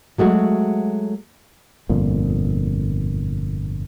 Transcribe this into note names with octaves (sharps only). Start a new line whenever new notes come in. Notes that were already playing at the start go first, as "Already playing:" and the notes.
F#3 G#3 A3 F#4
G1 F2 A#2